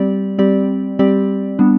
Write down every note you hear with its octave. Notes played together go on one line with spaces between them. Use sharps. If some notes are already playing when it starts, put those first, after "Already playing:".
Already playing: G3 C4 G4 D5
G3 C4 G4 D5
G3 C4 G4 D5
G3 B3 D4